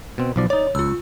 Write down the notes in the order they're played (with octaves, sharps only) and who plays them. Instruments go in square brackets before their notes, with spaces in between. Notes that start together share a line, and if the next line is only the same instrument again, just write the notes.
[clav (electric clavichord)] B2 C4
B1 F3 D5
[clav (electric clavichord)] D#4 D5 [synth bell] C#5
[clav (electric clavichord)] C#2 [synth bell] F4 E6